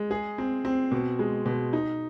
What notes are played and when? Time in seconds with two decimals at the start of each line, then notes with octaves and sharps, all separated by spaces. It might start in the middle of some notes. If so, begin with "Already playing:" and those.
Already playing: G#3
0.11 G#4
0.38 C4
0.65 C4
0.91 B2
1.19 G#3
1.46 B2
1.73 D#4